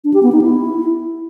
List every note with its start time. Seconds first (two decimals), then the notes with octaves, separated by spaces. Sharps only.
0.04 D4
0.14 G4
0.23 B3
0.32 D#4
0.41 E4